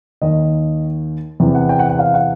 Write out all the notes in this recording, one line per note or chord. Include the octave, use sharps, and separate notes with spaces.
D#2 D#3 D#5
E2 C3 E3
F#5
G5
F#5
F#5
F5
F#5